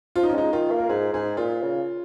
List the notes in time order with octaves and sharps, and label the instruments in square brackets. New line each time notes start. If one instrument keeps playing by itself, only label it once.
[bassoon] F3 [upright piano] F4
[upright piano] D#4
C#4
[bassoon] G#3 [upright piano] D#4
[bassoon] D#3 [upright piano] F4
[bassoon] A#3
[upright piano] A#4
[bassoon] G#2 [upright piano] G#4
[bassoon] G#2 [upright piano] G#4
[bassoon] A#2 [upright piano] F4
[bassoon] C#3